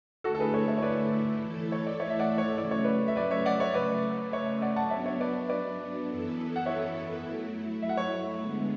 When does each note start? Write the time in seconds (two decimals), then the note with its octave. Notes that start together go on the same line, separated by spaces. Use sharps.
0.24 D3 A3 E4 F#4 A4
0.35 A4
0.39 G#4 B4
0.54 A4 C#5
0.68 C#5 E5
0.78 C#5
0.82 B4 D5
1.41 E3 A3 E4 A4
1.72 C#5
1.87 D5
2.00 C#5 E5
2.10 E5
2.20 D5 F#5
2.38 C#5 E5
2.58 C#3 F#3 A3 D5
2.71 C#5
2.84 B4 D5
3.08 E5
3.16 B4 D5
3.31 C#5 E5
3.45 D5 F#5
3.60 C#5 E5
3.74 C#3 F#3 A3 B4 D5
4.32 C#5 E5
4.61 D5 F#5
4.76 F#5 A5
4.91 F#3 B3 D4 C#5 E5
5.06 C#5 E5
5.20 B4 D5
5.49 B4 D5
6.08 F#2 E3 B3 E4 A4
6.56 F#5
6.66 C#5 E5
7.24 F#3 A3 E4
7.82 E5
7.89 F#5
7.97 C#5 E5
8.41 D3 G#3 B3